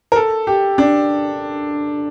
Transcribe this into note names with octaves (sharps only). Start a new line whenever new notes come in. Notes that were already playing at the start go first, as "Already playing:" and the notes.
A#4
A4
G4
D4